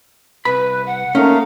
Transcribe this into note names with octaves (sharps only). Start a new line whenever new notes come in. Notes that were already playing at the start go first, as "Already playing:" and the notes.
C2 B4 B5
F#5
A3 A#3 C#4 D#4 F5